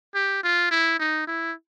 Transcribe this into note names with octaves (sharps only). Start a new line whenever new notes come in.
G4
F4
E4
D#4
E4